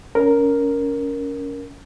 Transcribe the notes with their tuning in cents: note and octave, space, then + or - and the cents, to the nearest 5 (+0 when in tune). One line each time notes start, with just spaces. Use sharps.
C#4 +20 A#4 +0